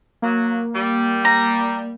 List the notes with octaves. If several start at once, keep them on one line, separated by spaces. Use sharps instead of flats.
F#3 A#3
G3
A#5